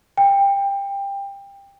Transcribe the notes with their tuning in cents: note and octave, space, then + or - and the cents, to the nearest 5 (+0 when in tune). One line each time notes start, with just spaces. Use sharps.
G5 +20